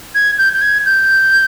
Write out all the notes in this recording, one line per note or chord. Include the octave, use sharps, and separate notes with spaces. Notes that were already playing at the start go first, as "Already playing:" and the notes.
G#6
G6
G6
G#6
G6